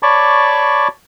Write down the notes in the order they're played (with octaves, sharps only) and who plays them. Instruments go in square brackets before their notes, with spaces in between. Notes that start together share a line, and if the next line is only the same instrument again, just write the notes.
[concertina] C#5 D5 A5 B5 C#6 D6